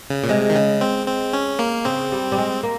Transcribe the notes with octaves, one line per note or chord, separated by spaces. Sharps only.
C#3
A#2
C3 G#3
D#3
C#3
C4
C4
C#4
A#3
C#3 C4
G3
G3
G#3
A#3